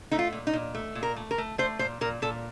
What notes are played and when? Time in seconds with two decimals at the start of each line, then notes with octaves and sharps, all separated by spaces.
0.11 A3 D#4
0.19 F4
0.32 A#2
0.47 D#4
0.53 A#2
0.75 A3
0.95 A#2
1.03 A#4
1.16 A3
1.31 A#4
1.38 A3
1.58 A3 C5
1.79 A#2 C5
2.01 A#2 A#4
2.22 A#2 A4